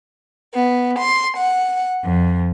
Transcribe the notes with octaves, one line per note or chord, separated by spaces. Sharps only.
B3
C6
F#5
F2